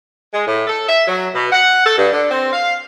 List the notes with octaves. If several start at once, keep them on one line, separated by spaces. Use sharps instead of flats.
G#3
A2
A4
E5
F#3
B2
F#5
A4
G2
D3
C4
F5